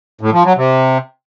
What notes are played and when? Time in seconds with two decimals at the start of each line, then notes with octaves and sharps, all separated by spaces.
0.21 A2
0.33 F3
0.45 F#3
0.57 C3